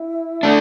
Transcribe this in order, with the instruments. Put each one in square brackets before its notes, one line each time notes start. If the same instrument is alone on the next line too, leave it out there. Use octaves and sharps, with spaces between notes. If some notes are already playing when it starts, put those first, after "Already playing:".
Already playing: [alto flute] E4
[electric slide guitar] A3 D4